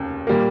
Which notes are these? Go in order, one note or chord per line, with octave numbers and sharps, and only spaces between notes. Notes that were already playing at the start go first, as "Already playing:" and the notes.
Already playing: F1 D#2 C#3
A#2 G3 A#3